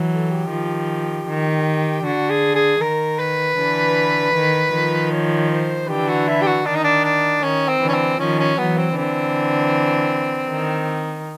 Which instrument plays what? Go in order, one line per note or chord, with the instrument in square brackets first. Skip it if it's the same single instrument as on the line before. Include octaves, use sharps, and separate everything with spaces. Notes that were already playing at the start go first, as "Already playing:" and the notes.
Already playing: [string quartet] E3 F#3
[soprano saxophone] A4
G4
[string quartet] D#3 F3
D#3
[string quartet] D3 [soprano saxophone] F#4
[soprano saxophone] G#4
G#4
[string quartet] D#3 [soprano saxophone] A#4
[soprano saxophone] B4
[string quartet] D3 E3
D#3
D#3 F3
[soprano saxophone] C#5
C5
[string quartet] D3 E3 [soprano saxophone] G4
[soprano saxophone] F#4
E4
G4
F#4
[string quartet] D#3 [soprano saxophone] D4
[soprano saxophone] D#4
D4
D4
[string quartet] D#3 [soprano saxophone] C#4
[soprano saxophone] C4
[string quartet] D3 E3
[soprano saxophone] C#4
C4
[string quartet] D#3 F3 [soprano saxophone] C#4
[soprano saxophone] C#4
[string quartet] E3 F#3 [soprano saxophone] B3
[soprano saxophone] C4
[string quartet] D3 E3 [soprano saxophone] C4
[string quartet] D#3